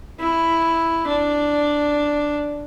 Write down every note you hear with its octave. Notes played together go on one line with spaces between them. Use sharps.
E4
D4